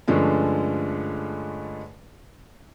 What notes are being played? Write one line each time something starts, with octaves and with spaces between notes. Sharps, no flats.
G2 D3 F3 G#3 A3 C#4